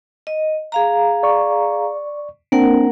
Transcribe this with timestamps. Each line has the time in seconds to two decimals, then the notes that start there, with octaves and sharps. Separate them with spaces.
0.27 D#5
0.72 G#4 F5 A#5
1.23 D5 C#6
2.52 A#3 C4 D4 A#4 F#5